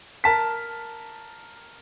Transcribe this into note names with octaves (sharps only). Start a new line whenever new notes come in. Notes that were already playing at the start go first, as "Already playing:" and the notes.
A#4 A5 B6